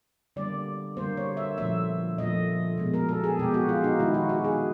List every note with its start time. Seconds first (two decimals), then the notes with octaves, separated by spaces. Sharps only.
0.36 D3 G3 A#3 D5
0.97 D3 G3 A#3 C5
1.17 C#5
1.37 E5
1.57 A#2 F3 A3 E5
2.18 A#2 F3 A3 D#5
2.78 B2 G#3
2.94 A#4
3.09 A4
3.24 G#4
3.39 B2 G#3 G4
3.54 F#4
3.69 F4
3.84 D#4
3.99 D#3 G#3 E4
4.14 F#4
4.29 F#4
4.44 G#4